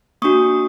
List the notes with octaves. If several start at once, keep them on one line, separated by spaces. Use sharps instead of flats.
A#3 D4 F#4 C#6 D#6